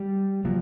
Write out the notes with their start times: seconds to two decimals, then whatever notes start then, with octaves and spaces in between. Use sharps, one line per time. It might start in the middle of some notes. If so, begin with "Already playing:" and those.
Already playing: G3
0.45 C#3 F3 F#3 A#3